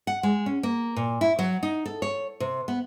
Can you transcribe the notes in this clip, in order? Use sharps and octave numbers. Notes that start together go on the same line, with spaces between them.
F#5
G#3
C#4
A#3
A#2
E4
F#3
D#4
A4
C#5
C3
B3